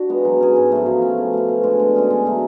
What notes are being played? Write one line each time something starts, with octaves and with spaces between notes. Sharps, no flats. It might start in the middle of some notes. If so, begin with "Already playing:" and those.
Already playing: D4 F#4
G#3 B3
F#3
C#4 G#4
G#2
F#3 A3
F3
A3 C#4
B2
A3 C#4
B2
G#3 D4
D3
G#3 C#4 G#4
D3
F#3 A3